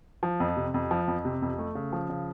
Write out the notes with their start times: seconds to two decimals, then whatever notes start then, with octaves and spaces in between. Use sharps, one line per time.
0.23 F3
0.40 F2
0.57 C3
0.74 F2
0.91 F3
1.08 F2
1.25 C3
1.42 F2
1.58 A3
1.75 C#3
1.92 F3
2.10 C#3